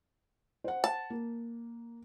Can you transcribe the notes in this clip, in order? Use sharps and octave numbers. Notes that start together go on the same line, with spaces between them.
C5 F#5
A5
A#3